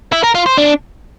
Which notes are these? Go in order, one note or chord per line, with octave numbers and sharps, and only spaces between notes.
E4
A#4
F4
C5
D4